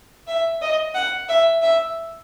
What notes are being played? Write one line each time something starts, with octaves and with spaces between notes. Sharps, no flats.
E5
D#5
F#5
E5
E5